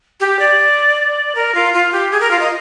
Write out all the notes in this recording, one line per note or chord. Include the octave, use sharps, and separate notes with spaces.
G4
D5
A#4
F4
F4
G4
G#4
A#4
F4
D#5